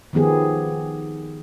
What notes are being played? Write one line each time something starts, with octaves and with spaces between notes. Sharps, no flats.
D#3 F3 B3 G4 G#4